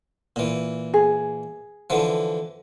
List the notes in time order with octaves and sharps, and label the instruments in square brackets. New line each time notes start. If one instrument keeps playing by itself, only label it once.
[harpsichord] A#2 E3
[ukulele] G#4
[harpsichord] D3 E3 F3